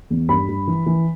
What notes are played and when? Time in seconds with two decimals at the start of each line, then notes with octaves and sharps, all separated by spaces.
0.10 E2
0.29 G2 B5
0.49 G2
0.67 E3
0.86 E3